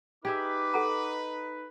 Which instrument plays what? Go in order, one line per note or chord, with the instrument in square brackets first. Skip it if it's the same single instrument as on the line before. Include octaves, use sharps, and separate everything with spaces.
[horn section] D#4 B4 [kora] G4 G#4 E5 [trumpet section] D6
[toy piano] A4 F#5 A#5